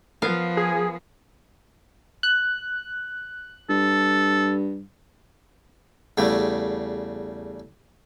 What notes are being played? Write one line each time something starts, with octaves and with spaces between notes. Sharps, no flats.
F3 B3 A#4 F5
G#4
F#6
G2 A4
E2 C#3 G3 A3